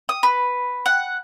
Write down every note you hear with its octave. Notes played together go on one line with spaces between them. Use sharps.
D#6
B4
F#5